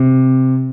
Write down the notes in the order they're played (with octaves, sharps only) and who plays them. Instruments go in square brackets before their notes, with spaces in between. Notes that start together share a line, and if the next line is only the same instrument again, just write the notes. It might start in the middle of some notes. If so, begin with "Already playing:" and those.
Already playing: [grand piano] C3